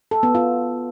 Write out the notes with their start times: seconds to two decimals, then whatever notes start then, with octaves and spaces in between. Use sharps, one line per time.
0.11 A4
0.23 B3
0.35 F4